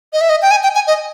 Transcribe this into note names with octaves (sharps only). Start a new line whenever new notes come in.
D#5
E5
D#5
G5
G#5
G5
G#5
D#5